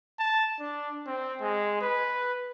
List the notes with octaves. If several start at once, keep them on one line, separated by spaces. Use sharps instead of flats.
A5
D4
C4
G#3
B4